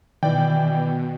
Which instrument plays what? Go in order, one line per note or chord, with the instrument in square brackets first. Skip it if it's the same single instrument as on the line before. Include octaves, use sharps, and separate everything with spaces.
[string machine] B2 [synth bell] D#3 [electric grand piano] E3 D5 G5